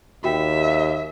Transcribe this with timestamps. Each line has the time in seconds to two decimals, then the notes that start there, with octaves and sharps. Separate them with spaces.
0.24 D#2 F#4 E5 G5